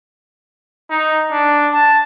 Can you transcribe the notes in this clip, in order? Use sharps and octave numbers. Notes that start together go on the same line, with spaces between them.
D#4
D4
A5